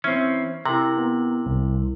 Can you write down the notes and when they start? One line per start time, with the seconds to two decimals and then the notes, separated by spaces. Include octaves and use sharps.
0.04 E3 C4 C#4 E5
0.66 C3 E4 A#4 A#5 F#7
0.97 B3
1.46 C2